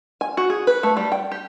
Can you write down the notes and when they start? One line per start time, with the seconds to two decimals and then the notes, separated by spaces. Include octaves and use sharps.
0.21 G#5
0.37 F#4
0.50 G#4
0.67 B4
0.83 A3
0.97 G3
1.12 G5
1.32 G4